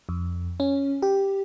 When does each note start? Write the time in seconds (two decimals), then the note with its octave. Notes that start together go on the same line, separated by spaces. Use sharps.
0.09 F2
0.60 C#4
1.02 G4